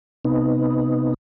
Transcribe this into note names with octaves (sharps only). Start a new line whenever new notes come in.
C3 B3 D#4